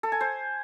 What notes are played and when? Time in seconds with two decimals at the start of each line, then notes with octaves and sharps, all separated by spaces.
0.03 A4
0.12 G#5
0.21 C5